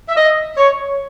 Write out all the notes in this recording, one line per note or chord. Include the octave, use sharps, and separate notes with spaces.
E5
D#5
C#5